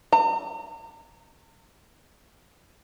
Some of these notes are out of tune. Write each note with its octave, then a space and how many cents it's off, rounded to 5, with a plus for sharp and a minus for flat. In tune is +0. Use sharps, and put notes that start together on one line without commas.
A#5 -40